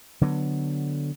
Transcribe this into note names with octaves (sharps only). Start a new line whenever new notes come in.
D3 F#3 B3